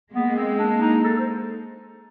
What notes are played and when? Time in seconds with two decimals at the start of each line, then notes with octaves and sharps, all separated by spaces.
0.13 G#3 A#3 B3
0.36 C4
0.58 D4
0.82 D#4
1.04 A4
1.19 C5